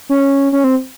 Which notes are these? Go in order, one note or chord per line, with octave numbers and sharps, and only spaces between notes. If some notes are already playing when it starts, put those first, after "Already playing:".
C#4
C#4
C4